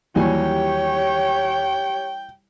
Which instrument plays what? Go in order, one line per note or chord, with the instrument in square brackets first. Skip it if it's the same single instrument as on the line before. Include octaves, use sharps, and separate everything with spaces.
[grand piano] D#2 F#3 G#5 [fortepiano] E3 G3 [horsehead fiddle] G4 C#5 [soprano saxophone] G5